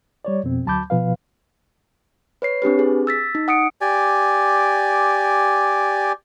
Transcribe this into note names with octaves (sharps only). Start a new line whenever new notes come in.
G3 C#5 D5
F2 B2 C4
D2 F#3 A5 B5 D6 G6
B2 F3 B4 F5
B4 C#5 C7
C4 D4 G4 B4
G#4
E6 A6 B6
D#4
F#5 D#6 C#7 D7
G4 D5 G#5